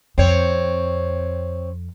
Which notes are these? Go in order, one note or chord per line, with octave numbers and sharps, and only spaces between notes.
F2 C4 C#5